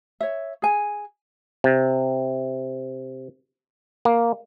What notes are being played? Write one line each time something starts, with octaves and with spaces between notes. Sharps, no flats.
C#5 E5
G#4 G#5
C3
A#3